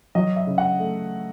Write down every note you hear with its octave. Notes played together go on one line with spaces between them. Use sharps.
F#3 D#5
E5
C#3
F#5
A3